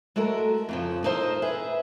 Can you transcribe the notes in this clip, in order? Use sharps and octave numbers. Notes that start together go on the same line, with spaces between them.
G#3 A3 F#4 A4 A#4
F2 C#3 F3
D#4 A4 A#4 C5 D#5
G#4 B4 E5